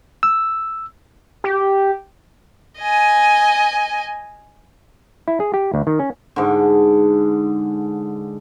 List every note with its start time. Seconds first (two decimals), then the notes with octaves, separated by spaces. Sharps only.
0.23 E6
1.44 G4
2.80 D#5 G#5
5.28 E4
5.40 G#4
5.54 G4
5.74 D2
5.87 D#3
5.99 C#4
6.36 G#2 D3